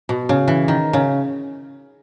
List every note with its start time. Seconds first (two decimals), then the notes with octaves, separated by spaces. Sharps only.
0.09 B2
0.29 C#3
0.48 E3
0.68 D#3
0.93 C#3